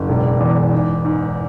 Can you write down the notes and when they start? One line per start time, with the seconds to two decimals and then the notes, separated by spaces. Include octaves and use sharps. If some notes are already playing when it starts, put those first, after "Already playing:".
Already playing: F#1
0.09 E1
0.40 E2
0.73 G#2
1.05 G#2